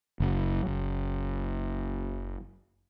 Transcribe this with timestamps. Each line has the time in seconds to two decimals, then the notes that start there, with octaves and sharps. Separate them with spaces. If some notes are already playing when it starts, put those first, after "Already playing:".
0.20 F#1
0.66 F#1